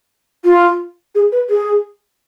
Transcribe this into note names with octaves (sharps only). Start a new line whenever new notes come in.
F4
G#4
B4
G#4